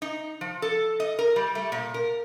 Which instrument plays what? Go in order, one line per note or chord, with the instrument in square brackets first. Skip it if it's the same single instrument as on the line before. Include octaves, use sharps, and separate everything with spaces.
[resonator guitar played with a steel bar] D#4
F3
A4
D#5
A#4
G3
A3
A#2
A#4